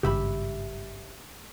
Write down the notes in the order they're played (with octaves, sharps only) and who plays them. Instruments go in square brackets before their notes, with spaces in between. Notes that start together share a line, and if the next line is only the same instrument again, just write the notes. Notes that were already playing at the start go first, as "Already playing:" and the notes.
[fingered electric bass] G#1 G2 C#3 [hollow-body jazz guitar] G4 E5 B5